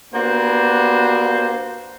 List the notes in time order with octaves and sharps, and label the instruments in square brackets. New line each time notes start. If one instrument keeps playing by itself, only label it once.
[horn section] A#3 B3 D4 F#4 G4 C5